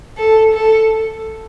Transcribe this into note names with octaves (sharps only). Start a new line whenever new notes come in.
A4
A4